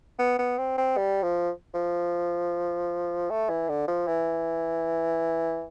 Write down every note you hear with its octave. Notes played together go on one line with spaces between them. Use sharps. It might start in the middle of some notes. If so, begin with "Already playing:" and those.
B3
B3
C4
C4
G3
F3
F3
A3
E3
D3
F3
E3